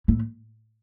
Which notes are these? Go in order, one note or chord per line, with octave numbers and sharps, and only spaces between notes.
A2